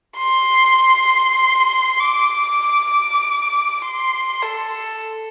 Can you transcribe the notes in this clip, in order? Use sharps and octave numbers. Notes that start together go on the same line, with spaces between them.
C6
D6
C6
A4